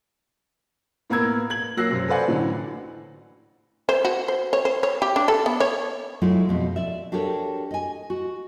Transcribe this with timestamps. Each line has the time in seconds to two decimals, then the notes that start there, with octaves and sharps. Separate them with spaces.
1.10 A2 A#3 B3 A#4 E6 G#6
1.50 G#6 F#7
1.77 F#3 A#3 E6 F#6 A#6 C7
1.89 F#2 C3 C4
2.08 A4 B4 C5 D5 F#5 G#5
2.28 A1 A2 D3 E3 F#3
3.89 C5
4.05 F#4
4.28 C5
4.53 C#5
4.65 C5
4.83 C#5
5.02 G4
5.16 D4
5.28 A4
5.46 B3
5.60 C#5
6.22 F#3 G#3 A3 E4 F4 G#4
6.49 F2 B2
6.76 D5 E5
7.12 D4 F#4 G4 A4 A#4 C#5
7.71 D#5 G#5
8.10 F#4